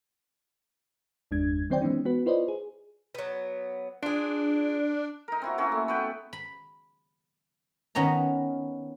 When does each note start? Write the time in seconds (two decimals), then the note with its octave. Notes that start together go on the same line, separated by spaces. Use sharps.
1.31 G1 E2 G#3 D4 G#6
1.70 D#3 F#3 C4 C5 D5 G5
1.81 E3 G#3 B3 C#4 D#4
2.05 B3 F#4 B4
2.26 E4 F4 B4 C5 D5 D#5
2.48 G#4
3.15 F#3 B3
4.03 D4 F4 G#4
5.28 D#4 A#4
5.42 C4 E4 F#4
5.58 A#3 C#4 E4 F#4
5.72 A3
5.88 B3 B4 G5
6.33 B5
7.95 D#3 B3 C#4 D#4 A#5